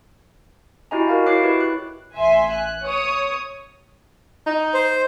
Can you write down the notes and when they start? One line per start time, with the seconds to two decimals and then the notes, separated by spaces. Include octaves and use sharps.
0.91 E4 F#4 G4 D#5 G#5 A#5
1.08 F#4 A#4 D#5 F5
1.26 E4 F#4 C#5 D6 F#6 C7
1.43 E4 G4 B4
1.60 F#6
2.15 A1 E5 G#5 C6
2.53 F#6
2.83 C#5 D#6
4.46 D#4
4.74 C5